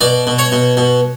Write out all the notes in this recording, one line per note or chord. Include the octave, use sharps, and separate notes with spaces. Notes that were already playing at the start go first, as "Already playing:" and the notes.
B2 D5
B2
C#5
B2
B2